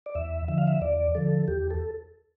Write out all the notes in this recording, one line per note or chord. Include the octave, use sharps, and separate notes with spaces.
D5
E2 E5
D3 F3 E5
F5
E5
E2 D5
D3 F3 A4
E2 G4
A4